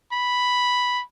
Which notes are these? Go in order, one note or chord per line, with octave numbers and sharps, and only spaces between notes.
B5